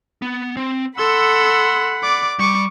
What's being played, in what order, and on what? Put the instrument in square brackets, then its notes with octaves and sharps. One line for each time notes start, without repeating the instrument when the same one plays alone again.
[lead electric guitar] B3
C4
[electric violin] A4 E6 [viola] F#5 B5 [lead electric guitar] C6
[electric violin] D5 D6
[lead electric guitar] G3 [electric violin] C#6 D6